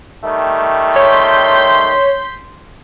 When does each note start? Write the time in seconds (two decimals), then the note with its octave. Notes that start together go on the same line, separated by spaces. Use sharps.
0.24 D#3 G3 A3
0.96 C#5 C6 G6 B6